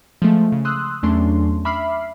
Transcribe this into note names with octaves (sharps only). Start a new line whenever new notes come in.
F3 G#3 A3
C#3
C6 D#6 E6 F#6
E2 F#3 A3 C#4 D4 C6
E5 B5 D6 F6 C7